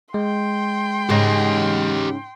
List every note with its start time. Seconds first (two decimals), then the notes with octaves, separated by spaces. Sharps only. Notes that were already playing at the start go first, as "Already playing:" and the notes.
0.14 G#3 G5 C6
1.09 G#2 C#3 G4 D#5